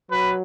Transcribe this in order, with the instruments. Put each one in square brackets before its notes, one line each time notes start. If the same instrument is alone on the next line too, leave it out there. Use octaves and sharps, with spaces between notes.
[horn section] F#3 B4